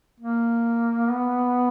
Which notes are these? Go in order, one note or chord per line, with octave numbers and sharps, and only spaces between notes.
A#3
B3